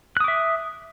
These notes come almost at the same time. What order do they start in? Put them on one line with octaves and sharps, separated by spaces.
F#6 D#6 D6 E5